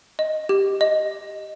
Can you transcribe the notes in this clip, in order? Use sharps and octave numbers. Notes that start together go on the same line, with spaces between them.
D#5
G4
D#5